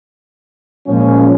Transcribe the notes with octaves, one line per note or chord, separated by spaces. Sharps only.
A#2 F3 G#3 C#4